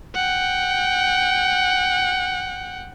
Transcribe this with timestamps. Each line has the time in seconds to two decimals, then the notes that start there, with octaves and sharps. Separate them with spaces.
0.15 F#5 G5